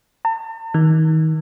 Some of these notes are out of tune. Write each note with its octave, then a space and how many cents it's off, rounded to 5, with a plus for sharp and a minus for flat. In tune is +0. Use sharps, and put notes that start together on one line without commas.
A5 +45
D#3 +30